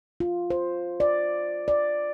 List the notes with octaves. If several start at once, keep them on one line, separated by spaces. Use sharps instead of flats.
F4
C5
D5
D5